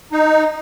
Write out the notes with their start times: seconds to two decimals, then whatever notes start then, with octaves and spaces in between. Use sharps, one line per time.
0.12 D#4